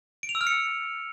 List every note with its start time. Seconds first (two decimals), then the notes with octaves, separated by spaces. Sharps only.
0.23 D7
0.29 F7
0.35 E6
0.41 F6
0.47 C#7